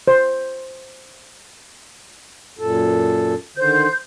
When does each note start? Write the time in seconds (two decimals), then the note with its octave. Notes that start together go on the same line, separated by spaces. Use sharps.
0.08 C5
2.59 F#2 A#2 A4
3.57 D3 D#3 C5 G6